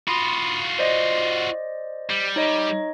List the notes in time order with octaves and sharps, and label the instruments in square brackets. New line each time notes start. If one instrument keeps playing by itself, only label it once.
[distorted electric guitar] F4 F#4 [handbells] B5 C6 D#6
[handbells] C5 D5 D#5
[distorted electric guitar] G3
[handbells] D#4 C#5 D#5